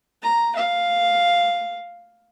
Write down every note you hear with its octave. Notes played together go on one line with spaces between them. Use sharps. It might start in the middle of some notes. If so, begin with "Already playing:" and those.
A#5
F5